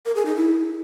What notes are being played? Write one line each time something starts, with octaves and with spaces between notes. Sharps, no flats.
A#4
G#4
D#4
E4